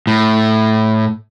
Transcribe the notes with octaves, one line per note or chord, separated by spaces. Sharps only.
A2